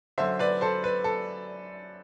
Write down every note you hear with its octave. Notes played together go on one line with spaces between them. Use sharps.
F#2 D3 C5 E5
B4 D5
A4 C5
B4
A4